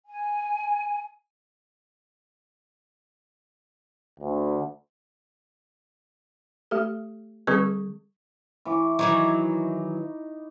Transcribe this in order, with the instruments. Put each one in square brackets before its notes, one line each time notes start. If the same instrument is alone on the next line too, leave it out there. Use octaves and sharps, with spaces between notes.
[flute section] G#5
[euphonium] D2
[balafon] A3 G4 A4
D3 G3 C4 G#4 B4 C#6
[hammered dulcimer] E3 C#6 D6
[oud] D#3 E3 F#3 [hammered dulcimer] D#4 C#6 D6